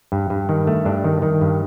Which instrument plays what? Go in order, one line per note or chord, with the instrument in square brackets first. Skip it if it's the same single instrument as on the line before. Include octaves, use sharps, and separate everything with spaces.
[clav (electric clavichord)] G2
G2
D#3
A3
G2 D4
D#3
D#3
G2